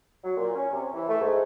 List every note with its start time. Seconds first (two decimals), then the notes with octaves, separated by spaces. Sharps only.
0.24 F#3
0.37 A#2
0.55 C#4
0.72 C3
0.94 E3
1.09 A3
1.21 G#2